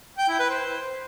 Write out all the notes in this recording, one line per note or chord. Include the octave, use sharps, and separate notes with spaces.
G5
E4
B4
C5